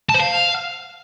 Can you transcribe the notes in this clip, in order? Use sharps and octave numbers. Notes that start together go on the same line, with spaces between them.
A5
C5
F5